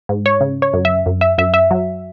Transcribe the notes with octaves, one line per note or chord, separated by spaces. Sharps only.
G#2
C#5
C#3
C#5
F#2
E5
F#2
E5
F#2 E5
E5
F#3